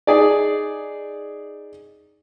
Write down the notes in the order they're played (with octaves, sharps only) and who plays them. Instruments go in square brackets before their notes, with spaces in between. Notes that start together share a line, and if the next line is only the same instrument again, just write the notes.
[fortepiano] D#4 G#4 D5